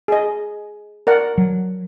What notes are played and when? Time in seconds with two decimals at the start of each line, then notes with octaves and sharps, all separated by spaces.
0.08 G#4 D#5
1.07 A#4 D5 F#5
1.38 F#3